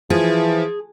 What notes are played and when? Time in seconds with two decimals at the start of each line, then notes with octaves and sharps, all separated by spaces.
0.10 E3 F3 G#4